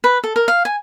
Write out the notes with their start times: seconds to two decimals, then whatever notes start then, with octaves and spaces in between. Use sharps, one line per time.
0.04 B4
0.24 A4
0.36 A#4
0.48 F5
0.65 G#5